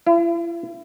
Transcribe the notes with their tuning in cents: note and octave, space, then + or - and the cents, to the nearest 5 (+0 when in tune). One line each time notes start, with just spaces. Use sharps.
E4 +40